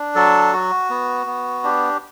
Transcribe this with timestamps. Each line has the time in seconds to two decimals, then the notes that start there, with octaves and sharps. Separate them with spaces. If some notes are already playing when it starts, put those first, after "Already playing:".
Already playing: D4
0.15 F#3 A4
0.53 F#4
0.90 B3
1.26 B3
1.64 D4 G4